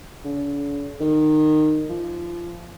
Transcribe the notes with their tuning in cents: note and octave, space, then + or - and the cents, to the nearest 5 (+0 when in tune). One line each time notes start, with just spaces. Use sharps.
D3 -45
D#3 -20
F3 -25